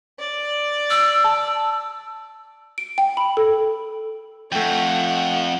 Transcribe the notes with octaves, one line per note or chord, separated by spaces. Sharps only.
D5
E6
A5
D7
G5
B5
A4
F2 A3 F#5 G5